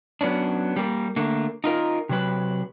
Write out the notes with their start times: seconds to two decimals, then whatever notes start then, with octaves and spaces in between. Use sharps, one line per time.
0.21 F#3 B3 C#4 D4
0.76 G3 A#3
1.16 D3 A3 A#3
1.64 D#4 F4 A#4
2.09 C3 F#3 B4